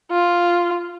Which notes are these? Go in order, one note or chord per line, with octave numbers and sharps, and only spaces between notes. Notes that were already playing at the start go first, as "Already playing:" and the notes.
F4